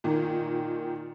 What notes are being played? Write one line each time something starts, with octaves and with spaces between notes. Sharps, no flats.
A#2 D#3